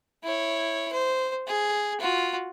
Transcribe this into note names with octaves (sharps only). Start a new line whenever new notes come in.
E4 C#5
C5
G#4
F4 F#4